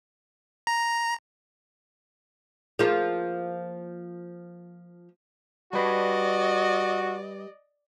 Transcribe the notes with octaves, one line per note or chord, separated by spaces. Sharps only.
A#5
F3 A#3 F4 G#4
G3 F#4 B4 D5 D#5